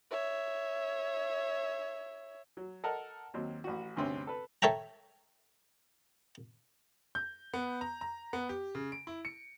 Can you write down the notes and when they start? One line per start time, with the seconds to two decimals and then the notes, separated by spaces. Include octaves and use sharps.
0.11 C#5 E5
2.57 F#3
2.84 A4 A#4 D#5 F#5 A5
3.34 D#2 F#3 C4
3.64 A1 F#4
3.96 D2 G2 C3 C4 C#4
4.27 A4 B4
4.62 A4 C#5 E5 G5 A#5
7.15 G6
7.54 B3
7.81 A#5
8.01 A#5
8.33 B3
8.49 G4
8.75 C#3
8.92 D7
9.07 E4
9.25 C#7